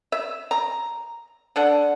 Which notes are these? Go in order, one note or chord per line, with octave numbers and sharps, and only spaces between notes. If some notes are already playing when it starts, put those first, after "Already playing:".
E5
A#5
D3 D4 F#5